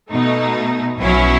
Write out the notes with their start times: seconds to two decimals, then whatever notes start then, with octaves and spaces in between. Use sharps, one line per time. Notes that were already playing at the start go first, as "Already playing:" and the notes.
0.12 B2 A3 D#4
0.99 B1 B2 F#3 C#4 E4